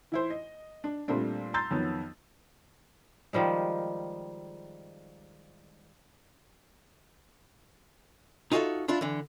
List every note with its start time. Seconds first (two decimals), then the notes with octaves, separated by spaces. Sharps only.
0.12 E3 E4 C5
0.30 D#5
0.84 D4
1.08 A#2 G3 A3 C4 D4
1.54 A#5 C6 E6 G6 A6
1.71 F2 D#3 F#3 B3
3.33 D#3 F3 G3 G#3
8.52 D#4 F4 F#4 G#4 A4 E5
8.88 D4 E4 F4
9.01 D3 E3